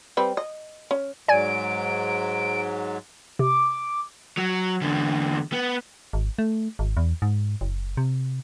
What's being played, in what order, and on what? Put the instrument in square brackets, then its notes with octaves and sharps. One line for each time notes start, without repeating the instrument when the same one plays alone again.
[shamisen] G3 C4 B4
D#5
C#4
[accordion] G#2 F#3 [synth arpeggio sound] D5 G#5 G#6 [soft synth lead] D7
[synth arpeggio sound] C3 [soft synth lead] D6
[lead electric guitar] F#3
E2 D3
B3
[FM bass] G#1
A3
G#1
E2
G#2
F#1
C3